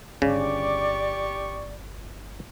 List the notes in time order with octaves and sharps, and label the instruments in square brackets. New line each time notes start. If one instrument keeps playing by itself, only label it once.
[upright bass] G1 C#4 [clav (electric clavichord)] C#3 [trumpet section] G4 C#6 [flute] D5